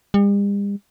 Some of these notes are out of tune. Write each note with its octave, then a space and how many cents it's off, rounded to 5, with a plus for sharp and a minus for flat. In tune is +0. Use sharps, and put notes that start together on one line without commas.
G3 +45